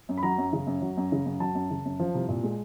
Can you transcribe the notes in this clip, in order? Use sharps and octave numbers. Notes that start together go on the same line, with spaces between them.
F#2
B5
F#3 A#5
F#2
C#3
F#2
F#3
F#2
C#3
F#2
F#3 A5
F#2
C#3
F#2
F3
C2
A#2
G#3